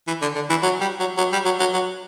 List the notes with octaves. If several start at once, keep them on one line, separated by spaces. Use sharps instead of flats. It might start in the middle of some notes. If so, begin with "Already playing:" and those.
E3
D3
D3
E3
F#3
G3
F#3
F#3
G3
F#3
F#3
F#3